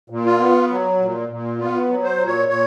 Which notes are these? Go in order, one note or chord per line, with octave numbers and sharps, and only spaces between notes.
A#2
F4
B3
F#3
A#2
A#2
B3 F4
F#3
C5
A#2
C#5
A#2 C#5